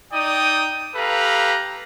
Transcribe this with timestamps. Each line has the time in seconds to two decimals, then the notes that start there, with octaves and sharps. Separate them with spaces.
0.13 D#4 D5 G5 D#6
0.96 G4 A4 B4 F5 A#5